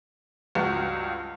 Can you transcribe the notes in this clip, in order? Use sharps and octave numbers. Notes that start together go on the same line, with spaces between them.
C#2 G2 F#4